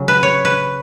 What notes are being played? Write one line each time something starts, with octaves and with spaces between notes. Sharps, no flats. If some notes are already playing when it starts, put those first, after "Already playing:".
Already playing: C#3 F#3
B4
C#5
B4